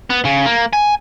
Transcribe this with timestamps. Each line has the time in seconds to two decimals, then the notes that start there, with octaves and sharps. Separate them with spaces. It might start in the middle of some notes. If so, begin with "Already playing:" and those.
0.10 B3
0.25 C#3
0.46 A#3
0.73 G#5